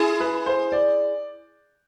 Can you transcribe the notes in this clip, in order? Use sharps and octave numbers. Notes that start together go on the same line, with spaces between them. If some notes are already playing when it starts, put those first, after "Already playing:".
Already playing: E4 G#4
B4
C5
D5